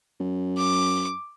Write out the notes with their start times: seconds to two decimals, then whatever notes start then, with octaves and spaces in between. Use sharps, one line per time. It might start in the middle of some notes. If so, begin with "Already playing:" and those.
0.20 F#2
0.57 D6